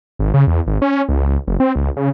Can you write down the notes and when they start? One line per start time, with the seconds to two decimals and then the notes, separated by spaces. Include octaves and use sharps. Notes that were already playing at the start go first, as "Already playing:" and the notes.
0.19 G#1
0.34 C#3
0.47 E2
0.67 G#1
0.82 C#4
1.09 C#2
1.48 F#1
1.60 C4
1.76 C#2
1.97 C#3